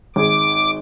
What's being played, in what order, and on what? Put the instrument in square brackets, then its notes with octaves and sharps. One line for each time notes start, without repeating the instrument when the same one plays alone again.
[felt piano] G#1 G#4 [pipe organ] D6